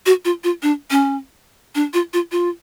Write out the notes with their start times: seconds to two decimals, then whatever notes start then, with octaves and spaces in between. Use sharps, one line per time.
0.06 F#4
0.25 F4
0.44 F4
0.62 D4
0.91 C#4
1.75 D4
1.94 F4
2.13 F4
2.32 F4